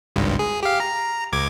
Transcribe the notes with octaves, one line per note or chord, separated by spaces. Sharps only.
G#1 C#2 G2
G#4
G4 F5
A#5
C#2 D6 G#6